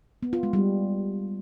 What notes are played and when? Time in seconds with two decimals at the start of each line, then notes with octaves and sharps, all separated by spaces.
0.23 B3
0.33 F4
0.43 G#3
0.53 G3